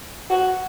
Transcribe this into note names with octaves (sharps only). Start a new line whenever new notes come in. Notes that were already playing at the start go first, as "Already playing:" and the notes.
F#4